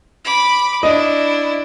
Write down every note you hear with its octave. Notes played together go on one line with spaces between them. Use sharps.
B5 D6
D4 E4 D#5